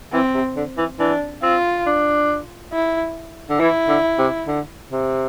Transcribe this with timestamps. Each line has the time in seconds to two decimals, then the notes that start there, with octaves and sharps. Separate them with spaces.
0.13 E3 C4
0.34 C3
0.57 D3
0.78 E3
0.99 E3 D4
1.43 C4 F4
1.87 D4
2.73 E4
3.50 D3
3.60 E3 E4
3.89 D3
4.18 C3
4.47 D3
4.91 C3